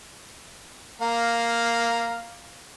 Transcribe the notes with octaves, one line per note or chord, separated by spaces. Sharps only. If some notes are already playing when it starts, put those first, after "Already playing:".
A#3 F5 A#5